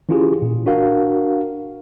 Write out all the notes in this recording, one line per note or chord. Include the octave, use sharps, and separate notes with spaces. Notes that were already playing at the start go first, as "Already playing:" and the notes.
E3 C#4 E4 F4 G4 G#4
A#2
D4 F#4 A#4 F5